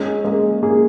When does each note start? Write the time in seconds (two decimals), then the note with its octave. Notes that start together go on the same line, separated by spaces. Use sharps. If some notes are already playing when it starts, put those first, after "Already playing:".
Already playing: G#3 C#4
0.25 G#3 A#3
0.63 A#3 G#4